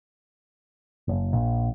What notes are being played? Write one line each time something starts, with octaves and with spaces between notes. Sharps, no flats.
F#1
A#1